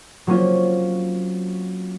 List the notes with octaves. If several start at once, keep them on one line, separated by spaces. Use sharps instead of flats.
F#3 A#3 C4 C#4 F4